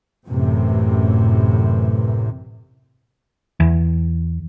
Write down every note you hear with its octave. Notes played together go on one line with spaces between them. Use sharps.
A1 F#2 A2 C3 E3
E2